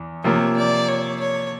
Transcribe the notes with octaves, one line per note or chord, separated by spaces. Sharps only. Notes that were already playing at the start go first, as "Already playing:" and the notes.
Already playing: E2
C3 F3 A#3 C#5
D5
C#5
C#5